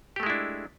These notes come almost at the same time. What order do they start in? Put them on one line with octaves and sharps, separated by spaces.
G4 A3 G#3 E4 D4